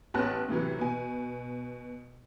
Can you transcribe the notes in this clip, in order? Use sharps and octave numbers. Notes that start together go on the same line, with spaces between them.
A1 B3 C#5 A5 F#6 A#6
A2 C3 E3 F#3
B2 G#5